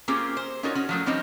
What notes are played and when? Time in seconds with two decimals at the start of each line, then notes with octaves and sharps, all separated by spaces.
0.08 A#3 C4 C#4 F4 G4 G#4
0.37 C5
0.63 C#4 D#4 F4 F#4 A#4 C#5
0.75 C#4 F#4
0.89 F3 F#3 A3
1.06 F3 G3 C4 C#4 D#4